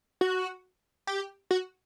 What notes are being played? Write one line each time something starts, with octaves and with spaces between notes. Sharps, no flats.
F#4
G4
F#4